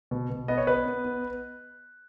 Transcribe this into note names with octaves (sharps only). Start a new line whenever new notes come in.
B2
B2
B3 D#5
C#5
B3 B4 D#5
B3
B3